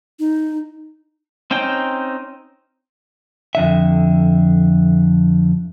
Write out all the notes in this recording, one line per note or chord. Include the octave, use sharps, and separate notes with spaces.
D#4
C4 C#4 D#4 G5
F2 D3 E5